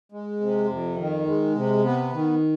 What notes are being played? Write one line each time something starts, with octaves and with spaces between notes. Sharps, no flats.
G#3
C3
F2
D#3
G#3
C3
B3
D#3